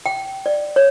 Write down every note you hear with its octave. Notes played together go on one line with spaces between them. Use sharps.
G5
D5
C#5